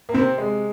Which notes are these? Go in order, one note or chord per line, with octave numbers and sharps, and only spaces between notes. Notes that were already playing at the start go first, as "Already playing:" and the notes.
A#3
C3 C4
G#3